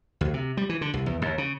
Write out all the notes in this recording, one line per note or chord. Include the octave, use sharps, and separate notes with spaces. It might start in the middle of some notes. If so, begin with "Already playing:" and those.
D2
C3
G3
E3
D3
C2
E2
D#2
C#3